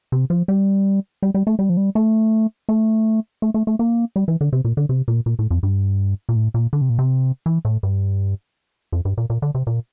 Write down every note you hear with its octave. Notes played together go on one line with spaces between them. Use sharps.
C3
F3
G3
G3
G3
A3
G3
F3
G3
A3
A3
A3
A3
A3
A#3
G3
E3
D3
C3
A#2
D3
C3
A#2
A#2
A2
F2
G2
A#2
A2
A#2
D3
C3
A#2
C3
E3
A2
G2
F2
G2
A#2
A#2
D3
C3
A#2